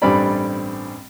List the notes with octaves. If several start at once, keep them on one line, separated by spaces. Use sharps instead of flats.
A1 G2 G3 C4 D5 B5